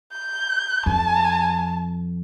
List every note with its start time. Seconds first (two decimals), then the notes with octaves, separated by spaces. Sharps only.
0.13 G6
0.86 F2 A5